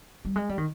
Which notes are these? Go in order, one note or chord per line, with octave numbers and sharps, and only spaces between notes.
G3
G#3
G3
D#3